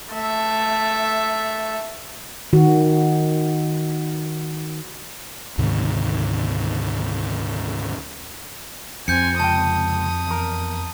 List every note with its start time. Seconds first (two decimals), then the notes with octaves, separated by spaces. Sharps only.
0.13 A3 E5
2.53 D#3 F#4
5.58 D2 G#2 C3 D#3
9.08 F2 C4 G#5 G6 C#7
9.40 C#2 C3 G5 A5 D#6
10.27 E2 A#4